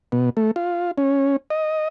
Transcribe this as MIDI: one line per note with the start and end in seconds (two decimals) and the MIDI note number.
0.12 0.30 47
0.37 0.51 57
0.56 0.91 65
0.98 1.36 61
1.50 1.88 75